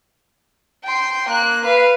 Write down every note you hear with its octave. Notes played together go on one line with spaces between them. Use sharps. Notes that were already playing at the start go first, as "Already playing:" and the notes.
G5 C6
A#3 F#6
B4 F5